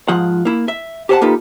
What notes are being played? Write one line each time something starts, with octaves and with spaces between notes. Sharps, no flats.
G#2 F3 F4 F#5
A#3 E4
E5
G4 G#4 C5 C#5 F#5 A5
A#3 D#4 F4 G4 A4 B4